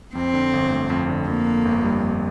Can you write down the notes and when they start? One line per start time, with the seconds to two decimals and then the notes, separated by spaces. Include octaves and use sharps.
0.15 F2 C4
0.34 D3
0.53 G1
0.72 A3
0.90 F2
1.10 D3
1.27 F2 A#3
1.46 D3
1.65 G1
1.84 G3
2.02 F2